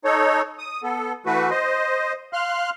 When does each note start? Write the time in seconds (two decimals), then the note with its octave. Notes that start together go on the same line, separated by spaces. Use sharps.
0.05 D#4 A4 C#5
0.59 D#6
0.83 B3 A4
1.26 E3 A3 F#4 B4
1.50 C5 D#5
2.33 F5 C6 F6 F#6